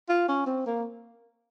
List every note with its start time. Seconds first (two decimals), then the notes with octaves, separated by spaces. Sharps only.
0.09 F4
0.28 C#4
0.46 C4
0.66 A#3